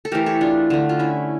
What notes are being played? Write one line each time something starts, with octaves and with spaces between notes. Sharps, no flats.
A4
E3 A3 G4 A#4
A4 C#5
D4 F4
D3 A3
F4
C#4 E4